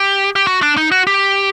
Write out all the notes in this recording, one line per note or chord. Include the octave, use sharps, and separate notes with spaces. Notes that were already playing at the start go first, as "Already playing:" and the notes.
Already playing: G4
G4
F#4
D4
D#4
F#4
G4